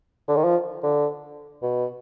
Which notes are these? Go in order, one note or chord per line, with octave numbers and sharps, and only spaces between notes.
D3
D#3
F3
D3
B2